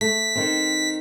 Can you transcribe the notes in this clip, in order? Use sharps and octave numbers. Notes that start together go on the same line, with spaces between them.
A3 B6
D#3 C4